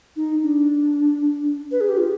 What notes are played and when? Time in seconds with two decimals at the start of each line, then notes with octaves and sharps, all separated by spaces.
0.16 D#4
0.43 D4
1.72 B4
1.81 G#4
1.89 G4
1.98 F4